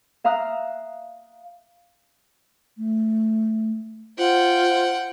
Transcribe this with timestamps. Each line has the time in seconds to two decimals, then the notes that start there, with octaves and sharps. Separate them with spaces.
0.24 E5 F5 A#5 D#6 F#6
2.78 A3
4.18 F4 C5 F#5 G5